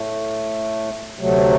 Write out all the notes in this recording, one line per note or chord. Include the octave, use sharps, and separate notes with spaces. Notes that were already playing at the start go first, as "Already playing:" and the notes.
Already playing: A2 A3
D2 C3 F#3 A3